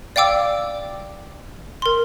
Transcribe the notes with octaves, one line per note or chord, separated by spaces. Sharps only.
D5 F5 G5 D6 E6
A#4 C6